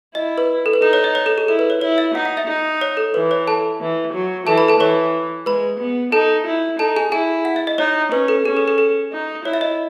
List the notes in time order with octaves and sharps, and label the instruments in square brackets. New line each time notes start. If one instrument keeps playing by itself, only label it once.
[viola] E4 [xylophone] D#5
[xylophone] B4
A4
B4
[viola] D#4 [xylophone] A4
[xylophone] C#5
D#5
C#5
A4
G#4
[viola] E4 [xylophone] A4
[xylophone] B4
C#5
[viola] E4 [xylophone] C#5
[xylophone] E5
[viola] D#4 [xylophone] F#5
[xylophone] F#5
E5
[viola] D#4
[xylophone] C#5
A4
[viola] E3 [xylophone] B4
[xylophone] C#5
A4 A5
[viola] E3
F#3
[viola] E3 [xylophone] A4 A5
[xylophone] B4 B5
A4 A5
[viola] E3 [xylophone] C#5 C#6
[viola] G#3 [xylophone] B4 B5
[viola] B3
[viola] D#4 [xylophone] A4 A5
[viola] E4
[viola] D#4 [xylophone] A4 A5
[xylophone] G#4 G#5
[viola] E4 [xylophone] G#4 G#5
[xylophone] F#5
E5
D#5
[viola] D#4 [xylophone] C#5
[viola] C#4 [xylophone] B4
[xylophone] A4
[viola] C#4 [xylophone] G#4
[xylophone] A4
A4
A4
[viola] D#4
[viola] E4 [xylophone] C#5
[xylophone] E5
D#5